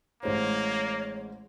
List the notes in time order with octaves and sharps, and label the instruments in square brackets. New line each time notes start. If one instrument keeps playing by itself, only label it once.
[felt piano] A1 G#3 C5 [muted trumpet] A#3 [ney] C#5